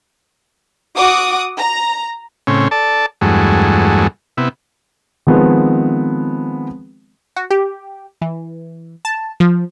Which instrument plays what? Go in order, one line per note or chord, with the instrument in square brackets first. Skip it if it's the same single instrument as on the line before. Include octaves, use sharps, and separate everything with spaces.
[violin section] F#4 F#5 D6 D#6
A#5
[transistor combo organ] A2 C#3 C4 C#4
A4 D5 A5
E2 G2 F#3 G#3 A3
C3 B3 E4
[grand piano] D#3 F3 G#3 B3 C4
[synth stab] F#4
G4
E3
A5
F3